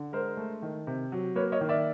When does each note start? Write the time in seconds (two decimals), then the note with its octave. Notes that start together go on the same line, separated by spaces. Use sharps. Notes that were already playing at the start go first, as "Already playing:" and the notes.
Already playing: D3
0.13 G#3 A#4 C5
0.37 A3
0.62 D#3
0.87 C3
1.12 F#3
1.36 A#3 B4 C#5
1.52 C#5 D#5
1.61 D#3
1.69 D5 E5